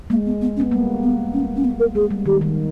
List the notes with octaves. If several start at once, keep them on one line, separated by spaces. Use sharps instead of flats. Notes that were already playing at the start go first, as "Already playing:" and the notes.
G#3 A#3
B3
B3
C#4
B3
G3 A#3 B3
B3
C#4
C#4
B3
A#4
G#3 G#4
G3
D#3 G4
D#3